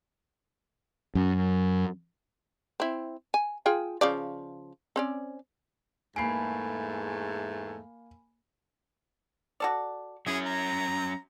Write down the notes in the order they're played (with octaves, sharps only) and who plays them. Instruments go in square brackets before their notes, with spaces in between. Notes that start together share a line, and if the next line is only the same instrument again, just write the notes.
[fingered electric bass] F#2
[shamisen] C4 E4
G#5
F4 G#4 G5
C#3 F3 D5
C4 C#4 D5
[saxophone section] E2 G#2 A3 [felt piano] A#3 C7 D7 [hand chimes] G#5 B5
[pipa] F#4 A4 D5
[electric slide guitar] F#3 C#4 [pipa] E4 [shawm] G#4
[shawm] A#5